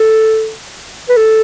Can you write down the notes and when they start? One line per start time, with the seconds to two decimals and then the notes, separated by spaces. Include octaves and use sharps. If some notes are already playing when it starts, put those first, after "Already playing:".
Already playing: A4
1.09 B4
1.17 A4